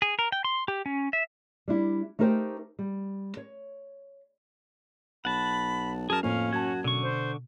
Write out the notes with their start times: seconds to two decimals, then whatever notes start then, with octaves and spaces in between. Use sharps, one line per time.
0.02 G#4
0.19 A#4
0.32 G5
0.45 C6
0.68 G4
0.86 C#4
1.13 E5
1.68 G3 D4 E4
2.19 A3 D#4 G4 A#4 C5 G5
2.79 G3
3.37 C#5
5.25 B1 F#5 A5 B5
6.10 F#2 G#4 A#4 A5
6.23 F2 A2 A#3 C#4 F5
6.53 F#2 F#4 A5 G#6
6.84 B2 D3 C#6
7.02 C5